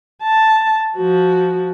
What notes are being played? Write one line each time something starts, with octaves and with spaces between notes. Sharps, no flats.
A5
F3 F#4